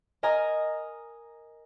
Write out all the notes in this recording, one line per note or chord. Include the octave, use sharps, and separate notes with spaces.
A#4 D#5 G#5 A#5 D#6